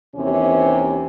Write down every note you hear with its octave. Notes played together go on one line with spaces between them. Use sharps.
D#2 C3 E3 C#4